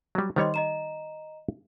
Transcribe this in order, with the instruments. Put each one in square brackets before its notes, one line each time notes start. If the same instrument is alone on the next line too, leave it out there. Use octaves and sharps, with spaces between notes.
[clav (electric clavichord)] F#3 G3
[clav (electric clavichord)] D#3 G3 C#5 [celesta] C5 D#5 C6
[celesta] D#5 A#5 E7